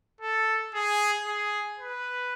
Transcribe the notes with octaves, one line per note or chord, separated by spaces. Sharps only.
A4
G#4
G#4
B4